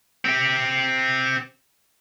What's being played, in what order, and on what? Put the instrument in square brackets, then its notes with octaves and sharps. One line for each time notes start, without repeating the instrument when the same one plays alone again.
[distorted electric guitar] C4 G4